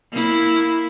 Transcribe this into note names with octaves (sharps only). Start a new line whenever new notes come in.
A#3 E4